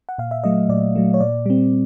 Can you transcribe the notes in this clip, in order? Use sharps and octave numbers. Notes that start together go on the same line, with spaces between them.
F#5
A#2 F5
E5
F#3 A3 D#5
A#2 D5
F#3 A3
C#5
A#2 D5
G3 C4